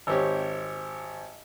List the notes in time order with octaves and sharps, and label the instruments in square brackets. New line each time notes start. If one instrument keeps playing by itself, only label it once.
[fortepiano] G#1 C4 G4 C#5